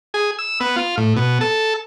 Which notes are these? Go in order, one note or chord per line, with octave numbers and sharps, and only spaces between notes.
G#4
E6
B3
F4
A2
B2
A4